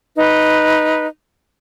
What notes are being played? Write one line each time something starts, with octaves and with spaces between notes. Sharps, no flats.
D#4 B4